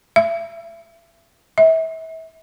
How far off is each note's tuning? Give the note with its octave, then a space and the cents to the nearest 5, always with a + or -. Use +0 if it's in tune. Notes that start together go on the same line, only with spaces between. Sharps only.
E5 +30
E5 -35